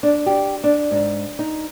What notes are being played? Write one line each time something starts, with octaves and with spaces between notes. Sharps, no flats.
D4
G4
D4
G#2
D#4